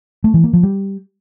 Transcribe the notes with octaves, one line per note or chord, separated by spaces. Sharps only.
A3
E3
A#3
F3
G3